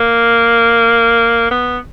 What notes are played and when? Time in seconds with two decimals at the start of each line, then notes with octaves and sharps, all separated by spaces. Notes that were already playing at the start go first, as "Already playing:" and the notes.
Already playing: A#3
1.51 B3